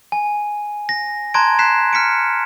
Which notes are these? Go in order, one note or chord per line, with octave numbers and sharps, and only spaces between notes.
G#5
A#6
A5 A#5 C6 F#6 G#6 D7
F#6 B6 C7 E7
F6 B6 C#7 D7